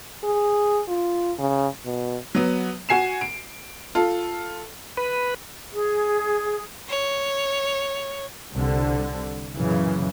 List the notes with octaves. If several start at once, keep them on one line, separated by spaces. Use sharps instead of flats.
G#4
F4
C#3
B2
F#3 B3
F#4 G#5 C7 E7
D7
F4 A4
B4
G#4
C#5
C2 D3
F#2 A#2 C#3 E3